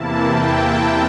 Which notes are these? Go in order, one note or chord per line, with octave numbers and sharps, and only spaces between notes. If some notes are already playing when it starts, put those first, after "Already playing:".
Already playing: E2 C3 E3 A#3 E4 A5
G5